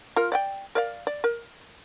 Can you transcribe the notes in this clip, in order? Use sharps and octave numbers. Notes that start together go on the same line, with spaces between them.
F4 A#4
D5 F#5 G5
A#4 D5 F5
D5
A#4